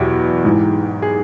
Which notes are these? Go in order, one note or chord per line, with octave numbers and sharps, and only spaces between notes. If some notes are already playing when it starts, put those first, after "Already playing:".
Already playing: E2 B2 F#3 E4 F#4 G4
G#2 E3
G#4